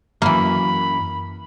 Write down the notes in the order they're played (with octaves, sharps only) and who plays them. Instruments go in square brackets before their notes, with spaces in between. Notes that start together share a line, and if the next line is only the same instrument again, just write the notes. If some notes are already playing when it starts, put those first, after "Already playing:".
[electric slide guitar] F#2 F#3 [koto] E3 A#3 [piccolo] B5